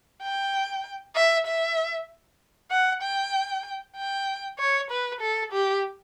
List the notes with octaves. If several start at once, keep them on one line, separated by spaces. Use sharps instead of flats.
G5
E5
E5
F#5
G5
G5
C#5
B4
A4
G4